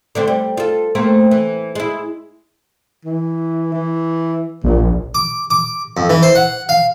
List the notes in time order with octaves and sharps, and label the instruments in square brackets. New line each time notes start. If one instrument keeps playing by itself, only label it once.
[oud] D3 A3 C4
G3
F4 A4
A3 A#3 C4
E3
G#3 E4
[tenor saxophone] E3
E3
[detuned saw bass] A#1 [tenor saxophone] A#2
[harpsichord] D6
D6
F2
E3
C5
F#5
F5